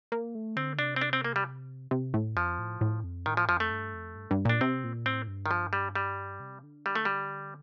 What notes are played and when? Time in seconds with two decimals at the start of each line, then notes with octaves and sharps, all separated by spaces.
0.12 A#3
0.35 A3
0.56 D3 C4
0.79 C3 D4
0.96 C4
1.01 D4
1.13 C4
1.24 A#3
1.36 G3
1.91 C3
2.14 A2
2.36 F2 F3
2.59 A2
2.81 A2
3.04 F2
3.26 A2 D#3
3.37 F3
3.48 F2 F3
3.60 A3
3.71 G2
3.94 F2
4.16 G2
4.31 G2
4.45 A#2 D4
4.61 C3 C4
4.84 A#2
5.06 A2 C4
5.28 G2
5.46 D#3
5.51 F3
5.73 G3
5.95 G3
6.40 C3
6.63 D3
6.86 G3
6.95 A3
7.05 G3